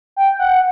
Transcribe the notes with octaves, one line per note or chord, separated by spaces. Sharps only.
G5
F#5